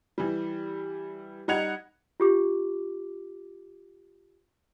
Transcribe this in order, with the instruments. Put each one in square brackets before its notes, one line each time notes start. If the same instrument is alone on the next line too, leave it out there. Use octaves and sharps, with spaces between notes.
[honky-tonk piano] E3 G3
G3 D#4 F#5 G#6 F7
[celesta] F4 G4 D6